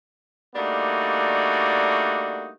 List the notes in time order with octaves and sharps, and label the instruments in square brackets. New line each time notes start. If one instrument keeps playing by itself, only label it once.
[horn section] G3 A3 A#3 D4 D#4 F#4